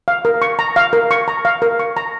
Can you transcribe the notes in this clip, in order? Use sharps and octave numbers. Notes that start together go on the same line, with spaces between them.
F5
A#4
C#6
A#5
F5
A#4
C#6
A#5
F5
A#4
C#6
A#5